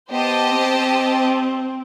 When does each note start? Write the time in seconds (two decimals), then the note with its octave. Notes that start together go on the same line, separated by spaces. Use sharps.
0.10 B3 G4 C5 D#5 A5
0.52 C4